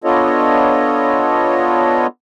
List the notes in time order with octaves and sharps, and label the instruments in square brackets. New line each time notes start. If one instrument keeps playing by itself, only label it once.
[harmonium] B3 D4 F4 A4 C#5 D#5